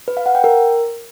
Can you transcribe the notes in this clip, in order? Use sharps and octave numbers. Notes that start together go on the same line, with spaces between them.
B4
F5
F#5
G5
A#4